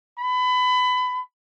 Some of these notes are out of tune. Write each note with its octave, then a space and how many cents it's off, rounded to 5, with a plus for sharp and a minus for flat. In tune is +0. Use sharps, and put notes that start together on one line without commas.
B5 +25